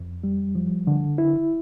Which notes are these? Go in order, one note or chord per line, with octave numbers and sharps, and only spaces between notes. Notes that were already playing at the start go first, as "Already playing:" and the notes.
Already playing: F2
G3
F3
D3
E4